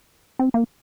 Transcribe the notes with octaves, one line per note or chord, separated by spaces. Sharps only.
C4
A#3